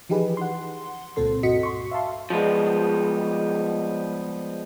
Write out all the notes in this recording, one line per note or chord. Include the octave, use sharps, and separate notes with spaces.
E3 F3 D#4 G4 G#4 B4
F#5 C6
C#2 A#2 C4 A4 C6
G2 F#4 D#5 B6 C#7
C6 C#6
E5 F5 A5 C6
F3 G3 G#3 B3